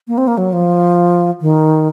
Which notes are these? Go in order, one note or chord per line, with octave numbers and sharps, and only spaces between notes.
A#3
C4
A#3
F#3
F3
D#3